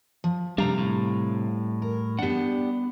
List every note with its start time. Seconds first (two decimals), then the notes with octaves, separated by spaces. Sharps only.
0.24 F3
0.58 C3 G3 D4 F5 A#5
0.78 A2
1.82 A#4
2.19 B3 D4 G4 F#5